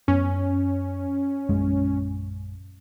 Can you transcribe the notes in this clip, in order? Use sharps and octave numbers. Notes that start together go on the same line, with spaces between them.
F#2 B3 C#4
A#1 F#2 G#3